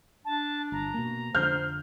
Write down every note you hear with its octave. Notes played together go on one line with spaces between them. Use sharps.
D4 A5
G1 A#5
B2 A#3
F2 D3 F3 C5 F6 G6